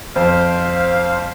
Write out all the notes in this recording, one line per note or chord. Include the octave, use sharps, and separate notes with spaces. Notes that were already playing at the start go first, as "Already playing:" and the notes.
F2 C5 F5